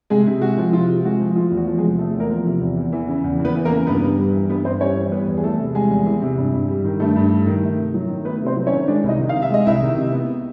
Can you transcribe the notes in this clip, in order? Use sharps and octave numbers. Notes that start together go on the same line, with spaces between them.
C3 G#3 G#4
C3
G#3 F#4
F3
C3 F4
C3
G#3 F#4
F3
A3 F4
E2
F#4
F3
G#3 G#4
C3
A3 A4
E2
A#3 A#4
F3
C3
E2
E2
E3
C#3
E2
E2
B3 B4
E3
A#3 A#4
C#3
G2 B3 B4
G2
G3
E3
G2 B3 B4
G2 C4 C5
G3 C#4 C#5
E3
G3 B3 B4
E2
G#4
E3 A3 A4
C3
G3 G#3 G#4
E2
E3
C3
G2
G2
G3
D#3
G2 A3 A4
G2
G3
D#3
A3
C3
F#3
D#3
A3 B3 B4
C3 C4 C5
F#3
C#4 C#5
D#3
G#3 D4 D5
C2
D#4 D#5
D#3
F5
C3
E5
G#3 D#5
C2 E4 E5
D#3
C3
B3